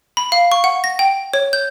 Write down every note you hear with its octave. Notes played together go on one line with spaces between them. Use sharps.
B5
F5
C#6
F#5
A#6
G5
C#5
G6